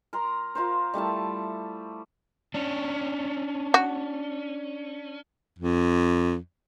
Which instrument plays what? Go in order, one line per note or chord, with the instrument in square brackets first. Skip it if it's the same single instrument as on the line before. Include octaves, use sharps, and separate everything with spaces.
[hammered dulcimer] A#4 A#5 C6
F4 A#4 C5
G3 A3 E4 A5
[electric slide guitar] C#4 D4
[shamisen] F#4
[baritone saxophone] F2